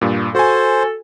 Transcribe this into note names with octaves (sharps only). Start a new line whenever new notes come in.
G2 A#2
F#4 A4 C5 G#5